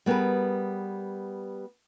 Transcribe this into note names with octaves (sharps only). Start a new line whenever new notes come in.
G3 B3 G#4 A#4 B4